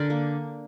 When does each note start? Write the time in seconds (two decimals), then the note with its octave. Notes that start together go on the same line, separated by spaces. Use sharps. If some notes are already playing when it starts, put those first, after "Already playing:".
Already playing: D3 D4 A#4 D5
0.10 A#3